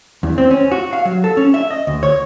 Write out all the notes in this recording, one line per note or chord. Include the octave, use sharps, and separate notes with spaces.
E2
C4
C#4
F#4
F5
F#3
A4
C#4
E5
D#5
D2
C#5